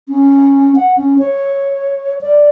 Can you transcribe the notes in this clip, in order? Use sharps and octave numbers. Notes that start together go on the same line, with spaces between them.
C#4
F#5
C#4
C#5
D5